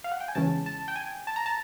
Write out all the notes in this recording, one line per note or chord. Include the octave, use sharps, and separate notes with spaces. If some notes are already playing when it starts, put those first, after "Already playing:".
F5
F#5
G5
G#5
E2 C#3 E3 G#3 C#4 A5
A5
G5
G#5
A5
A#5
A5